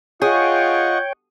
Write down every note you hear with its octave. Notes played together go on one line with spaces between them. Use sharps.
F4 G#4 C#5 D#5 F#5 G5 C#6